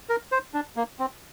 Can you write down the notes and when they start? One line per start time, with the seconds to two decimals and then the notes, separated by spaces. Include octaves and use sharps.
0.09 A#4
0.32 C5
0.54 D4
0.76 A#3
0.99 C4